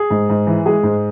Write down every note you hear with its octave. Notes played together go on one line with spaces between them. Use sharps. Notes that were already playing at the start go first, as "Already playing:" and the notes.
Already playing: G#4
G#2
G#2
E3
G#3 G#4
G#2